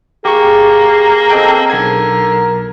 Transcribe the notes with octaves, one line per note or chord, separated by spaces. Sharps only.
A#3 G4 G#4 C#6
C4 A4 D#5 G5
B1 D3 A#4 G#6